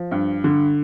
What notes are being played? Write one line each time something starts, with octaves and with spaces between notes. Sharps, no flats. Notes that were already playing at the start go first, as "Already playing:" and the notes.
Already playing: F3
G2
D3